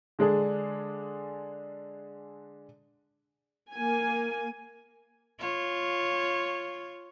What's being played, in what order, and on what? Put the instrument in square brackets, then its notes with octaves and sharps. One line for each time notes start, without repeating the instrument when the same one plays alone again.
[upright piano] D3 G#3 D4 G#4
[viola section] A#3 G#5
[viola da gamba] F4 C#5